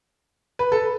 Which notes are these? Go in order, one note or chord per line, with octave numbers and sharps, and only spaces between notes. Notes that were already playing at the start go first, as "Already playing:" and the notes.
B4
A4